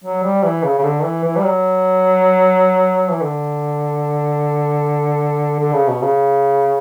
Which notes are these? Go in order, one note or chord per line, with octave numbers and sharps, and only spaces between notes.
F#3
G3
E3
C#3
C#3
D3
E3
E3
G3
F#3
E3
D3
D3
C#3
B2
C#3